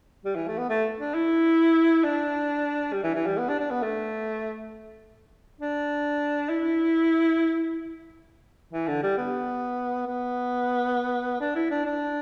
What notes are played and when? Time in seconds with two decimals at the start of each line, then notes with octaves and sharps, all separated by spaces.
0.25 G3
0.36 E3
0.48 A3
0.58 B3
0.69 A3
0.99 D4
1.14 E4
2.04 D4
2.93 G3
3.03 E3
3.15 E3
3.27 G3
3.38 B3
3.49 D4
3.60 D4
3.70 B3
3.83 A3
5.61 D4
6.49 E4
8.73 E3
8.88 D3
9.03 G3
9.18 B3
10.07 B3
11.40 D4
11.55 E4
11.71 D4
11.86 D4